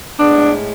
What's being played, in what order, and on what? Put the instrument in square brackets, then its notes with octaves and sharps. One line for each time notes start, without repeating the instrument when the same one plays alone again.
[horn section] A2 G#3 B3 D4